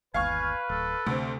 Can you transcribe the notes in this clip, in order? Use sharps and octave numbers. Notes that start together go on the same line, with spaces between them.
G1 D#2 B4 F5 G#5 C#6 F6
D1 A4
D2 C3 A3 C4